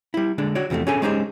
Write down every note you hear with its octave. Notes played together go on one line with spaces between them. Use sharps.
G3 E4
D3 G#3 D4
F#4 C#5 D5
E2 C3 F3 G#3 A3
C#4 D4 G#4 A4 G#5
G#3 C#4 D#4 G4 G#4 C5